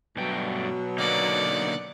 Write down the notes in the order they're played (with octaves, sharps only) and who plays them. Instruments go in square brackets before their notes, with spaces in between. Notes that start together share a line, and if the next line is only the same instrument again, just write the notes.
[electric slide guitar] G2 A3 G5 [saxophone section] B2 F#3
[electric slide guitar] D3 A#3 D#4 [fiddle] D5 F#5